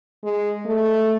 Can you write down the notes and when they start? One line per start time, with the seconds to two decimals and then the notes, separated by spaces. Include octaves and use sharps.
0.24 G#3
0.66 A3